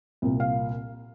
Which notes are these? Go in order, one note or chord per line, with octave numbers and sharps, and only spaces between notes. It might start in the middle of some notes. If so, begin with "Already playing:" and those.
C2 A#2
F5